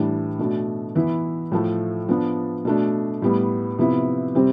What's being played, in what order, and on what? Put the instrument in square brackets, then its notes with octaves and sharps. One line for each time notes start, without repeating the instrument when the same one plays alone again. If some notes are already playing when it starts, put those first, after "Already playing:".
Already playing: [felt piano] A2 E3 G3 D4
B2 A3 D4
E3 B3 E4
A2 F3 A3
F3 B3 D4
B2 A3 D4
A2 G3 B3
C3 F3 B3 E4
C3 G3 C4